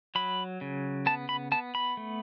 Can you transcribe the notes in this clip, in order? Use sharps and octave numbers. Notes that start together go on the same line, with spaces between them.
F#3 B5
C#3
B3 A5
B5
B3 A5
B5
A3